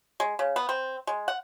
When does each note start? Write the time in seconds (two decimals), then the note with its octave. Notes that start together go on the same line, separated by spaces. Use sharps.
0.20 G#3
0.39 C#3
0.56 B3
0.69 C4
1.07 G#3
1.28 F#5